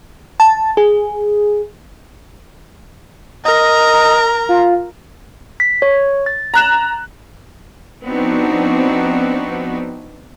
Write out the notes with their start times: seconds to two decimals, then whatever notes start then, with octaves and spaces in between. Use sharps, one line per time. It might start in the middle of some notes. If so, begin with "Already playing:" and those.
0.40 A5
0.77 G#4
3.45 A#4 D#5 A#5
4.49 F4
5.60 B6
5.82 C#5
6.26 A6
6.54 A#5 F#6 E7
8.05 F3 B3 C4 D4 D#4 F#4